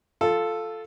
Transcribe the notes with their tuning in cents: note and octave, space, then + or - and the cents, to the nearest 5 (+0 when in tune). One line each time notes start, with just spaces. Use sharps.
F4 +0 A4 +0